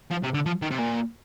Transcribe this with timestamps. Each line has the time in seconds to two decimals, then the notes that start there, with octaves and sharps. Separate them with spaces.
0.11 F3
0.24 C3
0.34 D3
0.46 F3
0.62 D#3
0.71 C3
0.79 A#2